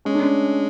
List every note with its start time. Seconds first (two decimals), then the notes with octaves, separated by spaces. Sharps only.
0.05 G#3 C#4
0.15 D4
0.22 C#4